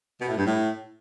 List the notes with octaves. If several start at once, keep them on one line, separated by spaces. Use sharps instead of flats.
B2
A2
G2
A2